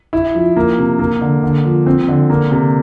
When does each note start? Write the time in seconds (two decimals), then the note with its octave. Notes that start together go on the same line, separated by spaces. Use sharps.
0.13 E4
0.35 F3
0.56 A#3
0.78 C3
0.99 A#3
1.21 D3
1.43 D3
1.65 F3
1.86 C4
2.08 D3
2.30 A#3
2.51 C3